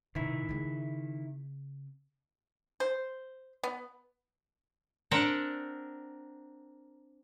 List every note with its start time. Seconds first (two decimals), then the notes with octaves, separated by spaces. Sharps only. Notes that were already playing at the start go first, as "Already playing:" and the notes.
0.15 A1 C3 D#3 E4
0.49 C#3 C4
2.80 C5
3.63 B3
5.11 C4 D4 A#4 F#5 G5 A5